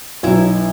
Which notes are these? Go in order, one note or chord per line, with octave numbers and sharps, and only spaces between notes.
B1 B2 F#3 E4